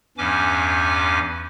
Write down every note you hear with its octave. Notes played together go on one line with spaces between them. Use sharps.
E2 G2 E3 C#4 G#5 D6